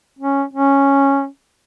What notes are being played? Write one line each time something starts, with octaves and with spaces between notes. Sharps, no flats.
C#4
C#4